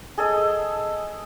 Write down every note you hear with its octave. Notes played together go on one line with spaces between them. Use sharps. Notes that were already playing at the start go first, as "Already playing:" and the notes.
G#4 A4 D#5